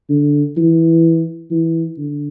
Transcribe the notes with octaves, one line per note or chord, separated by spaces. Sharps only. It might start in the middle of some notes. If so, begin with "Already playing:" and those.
D3
E3
E3
D3